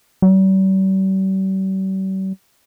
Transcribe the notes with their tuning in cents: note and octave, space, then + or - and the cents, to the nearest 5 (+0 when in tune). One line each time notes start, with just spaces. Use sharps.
G3 -45